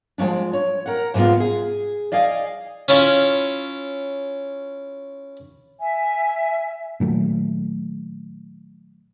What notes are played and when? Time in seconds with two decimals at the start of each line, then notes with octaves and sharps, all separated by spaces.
0.18 F3 G#3 A#3 C#4 D4
0.53 C#5
0.86 A#4 F#5
1.14 G#2 C3 G#3 B3 F4
1.40 G#4
2.12 D5 D#5 F5 G#5
2.88 C#4 E4 F4 C#5
5.80 E5 G#5
7.00 A#2 D#3 F#3 A3